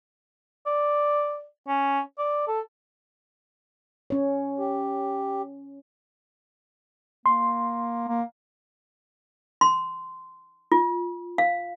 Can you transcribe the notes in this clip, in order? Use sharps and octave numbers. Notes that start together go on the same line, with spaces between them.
D5
C#4
D5
A4
C#4 C#5
G4
A#3 C6
A#3
C6
F4
F5